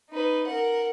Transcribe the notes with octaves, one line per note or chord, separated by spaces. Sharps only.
D#4 B4
A#4 F#5